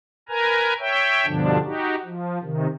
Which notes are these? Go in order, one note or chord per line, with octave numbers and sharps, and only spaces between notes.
A#4 B4 G#5 A#5
C#5 E5 G5
G2 B2 D3 F3 D4
D#4 F#4 G4
F3
C3 D#3